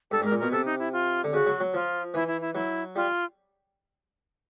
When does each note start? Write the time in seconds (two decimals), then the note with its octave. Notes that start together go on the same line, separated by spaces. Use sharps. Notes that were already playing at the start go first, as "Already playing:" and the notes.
0.11 G2 A4
0.22 G#2 A#4
0.32 A#2
0.39 B2 A#4
0.52 C3 A4
0.66 D#4
0.79 E4
0.93 F4
1.24 D3
1.33 C#3 F#4
1.47 F#3
1.60 F#3
1.74 F3 F4
2.14 E3 E4
2.28 E4
2.41 E4
2.55 F#3 E4
2.96 G3 F4